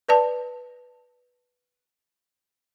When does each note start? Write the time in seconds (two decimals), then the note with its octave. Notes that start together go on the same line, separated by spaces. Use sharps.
0.09 B4 D5 A5